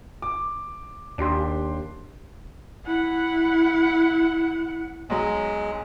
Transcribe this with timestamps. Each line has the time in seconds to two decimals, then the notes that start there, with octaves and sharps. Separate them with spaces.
0.22 D6
1.18 D#2 D4 G4 C6
2.85 E4 F#5
5.10 B1 F#3 G#3